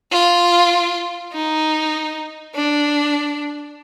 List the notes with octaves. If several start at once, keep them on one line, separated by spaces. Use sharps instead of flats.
F4
D#4
D4